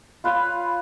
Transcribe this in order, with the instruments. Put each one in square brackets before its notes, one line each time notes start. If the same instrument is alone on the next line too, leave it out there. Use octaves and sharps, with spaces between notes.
[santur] F4 B4 C#5 F5